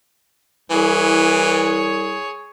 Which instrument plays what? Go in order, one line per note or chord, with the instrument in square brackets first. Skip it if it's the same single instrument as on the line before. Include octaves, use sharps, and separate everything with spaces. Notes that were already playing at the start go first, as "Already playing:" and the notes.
[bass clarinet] C2 [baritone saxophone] E3 [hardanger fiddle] G#4 C#5